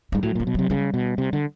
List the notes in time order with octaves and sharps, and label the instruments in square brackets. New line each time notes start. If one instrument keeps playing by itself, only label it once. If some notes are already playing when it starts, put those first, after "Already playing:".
[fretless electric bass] G#2 [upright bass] G3
[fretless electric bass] A2 [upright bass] F#3
[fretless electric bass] A#2 [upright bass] F#3
[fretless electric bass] B2
[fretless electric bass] C3 [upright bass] F#3
[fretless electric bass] C#3 [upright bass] G3
[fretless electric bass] B2
C3
D3